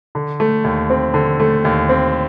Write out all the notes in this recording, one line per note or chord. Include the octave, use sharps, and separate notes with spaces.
D3
A3
D#2
C4
D3
A3
D#2
C4